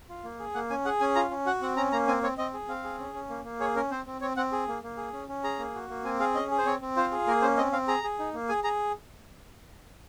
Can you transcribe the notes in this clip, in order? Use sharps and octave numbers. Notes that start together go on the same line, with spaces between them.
F4
A#3
G#4
A#3 F#5
C#4 G#5
G#4 F#5
C#4 G#5
F4 A#5
C#4
F#4 F#5
C4 F#5
C#4 A#5
A#3 A#5
C4 G#5
C4 C#5
C4 D#5
G#4
C4 F5
G#4
C#4
C#4
A#3
A#3
G#4 C#5
C#4 A#4
C4 C5
C4
C4 C#5
C4 F#5
G#4
A#3
A#3
G#4
C#4
C#4
G#4 A#5
A#3
F#4
A#3
C4 G#5
G#4 F5
C#4 D#5
G#4
C5
C4 C#5
C4
F4 C5
G#4
A#3 A#4
C#4 C5
C4 D#5
C4 F5
G#4 A#5
G#4
D#4
A#3
G#4 G#5
G#4 A#5